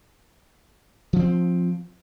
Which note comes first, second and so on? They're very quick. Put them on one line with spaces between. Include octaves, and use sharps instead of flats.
F3 C#4 C4